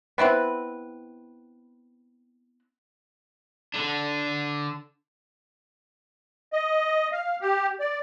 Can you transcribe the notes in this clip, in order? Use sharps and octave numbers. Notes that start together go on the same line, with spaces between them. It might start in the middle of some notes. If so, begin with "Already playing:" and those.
B3 C4 E4 B4
D3 D4
D#5
F5
G4
D5